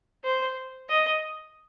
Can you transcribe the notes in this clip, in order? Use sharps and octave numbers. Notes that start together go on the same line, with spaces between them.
C5
D#5